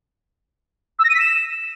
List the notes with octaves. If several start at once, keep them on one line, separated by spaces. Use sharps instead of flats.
E6
A#6
D#7
B6
E7